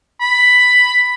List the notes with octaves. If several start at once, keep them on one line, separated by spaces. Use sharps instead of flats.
B5